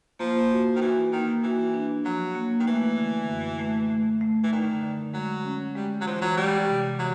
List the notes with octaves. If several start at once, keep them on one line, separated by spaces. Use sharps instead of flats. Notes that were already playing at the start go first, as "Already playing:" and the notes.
F3 A#3
F#4
D#3
E3 F#4
D#3 A#3
E3 F#4
D4
F3 F#3
A#3
D#3
E3 A3
D3
F#2
A3
A3
A3
E3
D3 D#3
D3
F#3 G#3
C#4
G3 G#3
F#3
E3 F3
F#3
G3 G#3
C3
E3 F#3